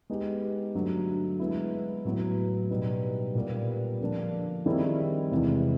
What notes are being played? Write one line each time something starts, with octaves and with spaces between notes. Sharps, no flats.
G#3 B3 D#4 G4
G2 D3 F#3 A3
G#3 B3 E4
A2 F#3 B3
B2 G3 B3 D#4
A#2 G3 B3
D3 F3 A#3 D4
D#3 G3 C4 E4 G#4
E2 C3 E3 G#3